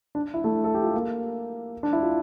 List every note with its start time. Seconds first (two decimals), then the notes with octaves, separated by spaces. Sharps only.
0.15 D4
0.34 E4
0.44 A3
0.64 A4
0.74 G4
0.84 F4
0.94 A#3
1.83 D4
1.93 E4
2.03 F4